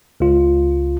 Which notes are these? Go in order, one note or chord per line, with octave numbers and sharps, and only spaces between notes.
C#2 F4